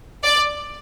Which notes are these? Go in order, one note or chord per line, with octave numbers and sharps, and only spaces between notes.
D5